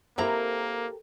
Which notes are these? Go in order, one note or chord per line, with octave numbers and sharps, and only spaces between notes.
A#3 C4 E4 G4 A4 A#4 A#5